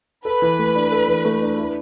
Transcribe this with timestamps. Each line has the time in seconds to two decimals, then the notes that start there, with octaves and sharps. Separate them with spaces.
0.25 A4 B4
0.42 E3
0.59 A3
0.75 D4
0.92 A4
1.08 E3
1.25 A3
1.42 D4
1.58 E4